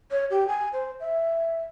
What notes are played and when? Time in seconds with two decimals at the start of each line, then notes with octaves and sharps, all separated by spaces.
0.11 C#5
0.30 G4
0.48 G#5
0.73 C5
1.00 E5